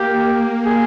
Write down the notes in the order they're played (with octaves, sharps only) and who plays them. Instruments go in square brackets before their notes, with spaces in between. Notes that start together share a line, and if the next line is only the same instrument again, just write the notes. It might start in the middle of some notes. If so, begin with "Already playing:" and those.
Already playing: [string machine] A#3 [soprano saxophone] G4
[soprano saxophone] G#4